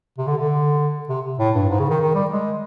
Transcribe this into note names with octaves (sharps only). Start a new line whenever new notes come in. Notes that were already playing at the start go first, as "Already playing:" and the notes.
C3
D3
D3
C3
A2
G2
G#2
C#3
D#3
D#3
G3
G#3